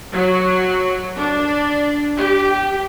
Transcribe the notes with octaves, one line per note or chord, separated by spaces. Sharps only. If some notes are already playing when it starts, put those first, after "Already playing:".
F#3
D4
G4